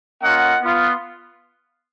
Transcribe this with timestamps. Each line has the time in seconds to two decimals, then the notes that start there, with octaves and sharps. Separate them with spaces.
0.22 A#3 C#4 F4 D#5 F#5
0.62 B3 F4